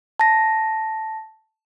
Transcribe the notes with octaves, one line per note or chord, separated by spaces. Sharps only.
A5 A#6